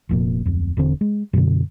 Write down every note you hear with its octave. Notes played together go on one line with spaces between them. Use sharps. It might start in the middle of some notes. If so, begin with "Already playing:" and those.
F1 F2 A#2
D1 F2
E1 D3 C4
G#3
F#2 B2 D3